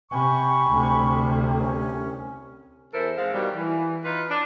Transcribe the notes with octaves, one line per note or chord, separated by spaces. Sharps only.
C3 G#5 B5 C#6
D2 C3
C2 C#4
E2 E4 A4 A#4 C5
G#2 G#3 C4 F5
B2 D#3 G3
E3
D#4 F4 B4
D4